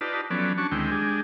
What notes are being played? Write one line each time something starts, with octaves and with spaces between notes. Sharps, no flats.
D#4 F4 G4 B4 D5 A5
F3 F#3 B3 C#4 A4 D5
C#4 D4 F#4 A5 C#6
D2 D#3 G#3 C4 E4 G5
G#3 D4 G4 G#4